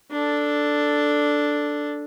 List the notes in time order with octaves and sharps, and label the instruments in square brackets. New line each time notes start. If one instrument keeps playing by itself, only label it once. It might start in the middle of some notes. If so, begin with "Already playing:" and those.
[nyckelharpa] D4 A4